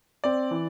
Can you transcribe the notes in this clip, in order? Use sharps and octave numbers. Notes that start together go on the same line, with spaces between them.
C4 D5
E3